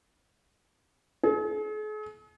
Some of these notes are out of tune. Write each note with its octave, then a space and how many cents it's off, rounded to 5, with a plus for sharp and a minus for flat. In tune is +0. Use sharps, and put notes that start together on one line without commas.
G#4 +45